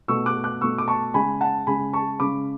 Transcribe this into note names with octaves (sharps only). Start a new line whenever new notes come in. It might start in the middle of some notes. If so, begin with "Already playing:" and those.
B2 A3 C#6 E6
D6 F#6
D6 F#6
B2 A3 C#6 E6
D6
A5 C#6
C#3 G#3 G#5 B5
F#5 A5
C#3 G#3 G#5 B5
A5 C#6
C#3 G#3 B5 D6